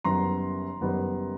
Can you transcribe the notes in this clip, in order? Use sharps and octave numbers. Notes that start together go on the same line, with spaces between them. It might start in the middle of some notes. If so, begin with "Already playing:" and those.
F#1 F#2 D#3 G3 B3 A#5 C6
F#1 F#2 D#3 G3 B3